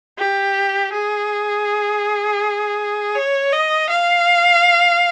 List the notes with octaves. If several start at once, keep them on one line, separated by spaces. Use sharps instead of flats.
G4
G#4
C#5
D#5
F5